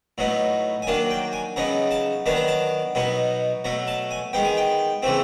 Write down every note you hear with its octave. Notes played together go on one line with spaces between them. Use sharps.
A2 F#3 B3 D#4
G#5
D#3 F#3 A#3 D4 A5
G5
G#5
C#3 F#3 B3 D#4 A#5
A5
D#3 F#3 B3 D4 A5
A#5
A5
B2 F#3 B3 D#4
B2 F#3 A3 A#5
A5
G#5
D#3 G#3 B3 G5
G#5
G5
C#3 E3 A3 C4